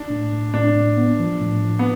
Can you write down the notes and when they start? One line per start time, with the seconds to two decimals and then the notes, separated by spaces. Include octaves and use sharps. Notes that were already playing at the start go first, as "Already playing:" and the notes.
Already playing: D4
0.10 A2
0.32 A2
0.54 A2 D4
0.75 A2
0.97 B3
1.19 F3
1.41 A2
1.62 F3
1.79 B3